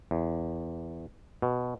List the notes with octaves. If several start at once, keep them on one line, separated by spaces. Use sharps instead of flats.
E2
B2